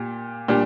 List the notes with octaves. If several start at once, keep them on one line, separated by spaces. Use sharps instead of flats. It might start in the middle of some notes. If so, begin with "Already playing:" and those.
Already playing: A#2 G4
A#2 G3 D4 G4